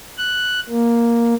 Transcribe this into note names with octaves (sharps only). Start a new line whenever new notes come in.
F#6
A#3